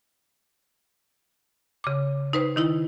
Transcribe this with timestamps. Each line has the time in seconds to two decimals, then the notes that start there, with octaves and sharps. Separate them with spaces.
1.84 C#3 D6
2.33 D#4 B4 C5
2.56 D#3 D#4 E4